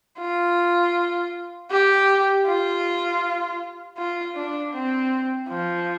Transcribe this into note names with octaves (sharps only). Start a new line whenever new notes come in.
F4
G4
F4
F4
D4
C4
F3